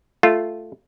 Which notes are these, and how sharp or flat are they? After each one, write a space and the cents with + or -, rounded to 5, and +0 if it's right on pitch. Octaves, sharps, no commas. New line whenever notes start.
A3 +0 F4 +0